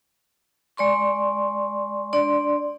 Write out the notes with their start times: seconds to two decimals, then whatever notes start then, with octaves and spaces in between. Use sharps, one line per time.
0.77 G#3 D5 C6 C#6
2.13 D4 D5 C6